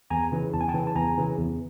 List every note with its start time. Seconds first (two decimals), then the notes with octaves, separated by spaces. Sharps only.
0.10 E2 G#5 A#5
0.32 C#3 E3
0.53 E2 A5
0.61 G#5
0.68 G5 A5
0.74 C#3 E3
0.87 A5
0.96 E2 G#5 A#5
1.17 C#3 E3
1.38 E2